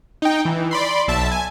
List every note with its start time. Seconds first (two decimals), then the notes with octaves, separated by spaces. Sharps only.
0.22 D#4 G5
0.45 E3
0.71 D5 B5 C6
1.08 B1 E5 A5
1.31 G#5